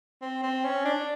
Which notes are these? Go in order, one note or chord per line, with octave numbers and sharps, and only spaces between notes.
C4
C4
C#4
D4